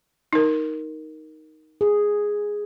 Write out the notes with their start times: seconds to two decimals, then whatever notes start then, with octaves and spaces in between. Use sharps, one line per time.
0.33 D#4 A#4
1.81 G#4